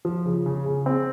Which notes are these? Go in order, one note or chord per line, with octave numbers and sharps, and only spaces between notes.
F3
C#3
C#3
C#3
C4